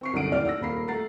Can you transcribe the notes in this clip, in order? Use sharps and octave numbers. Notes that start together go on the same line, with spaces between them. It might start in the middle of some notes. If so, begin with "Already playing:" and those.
C4 C#6 C7
C2 F#2 D3 F#5 D7
D#2 A2 D5 F6
F#5 E6 A#6
D#1 A#3 B5 C7
A3 F#5 A#5 A6 C7